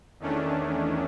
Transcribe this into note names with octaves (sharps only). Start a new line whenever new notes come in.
E2 D#3 A3 C#4 D4